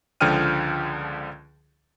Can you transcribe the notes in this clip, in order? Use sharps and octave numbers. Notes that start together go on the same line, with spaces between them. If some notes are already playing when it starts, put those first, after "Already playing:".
C#2 D3 F3 G5 F6 D#7